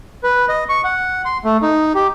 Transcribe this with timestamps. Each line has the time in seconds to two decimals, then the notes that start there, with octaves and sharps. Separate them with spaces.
0.23 B4
0.49 D#5
0.69 C#6
0.84 F#5
1.25 C6
1.44 A3
1.62 D#4
1.95 G4